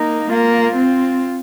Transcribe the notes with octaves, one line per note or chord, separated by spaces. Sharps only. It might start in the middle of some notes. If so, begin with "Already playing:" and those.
Already playing: A#3 D#4
A#3 F4
C4